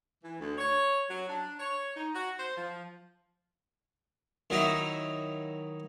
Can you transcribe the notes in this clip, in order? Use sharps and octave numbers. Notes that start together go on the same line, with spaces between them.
E3
D2
C#5
F#3
D4
C#5
D#4
F#4
C5
F3
D#3 F#3 D#4 E4